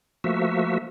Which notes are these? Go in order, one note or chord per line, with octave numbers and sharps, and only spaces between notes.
F3 A3 A#3 F#4 E5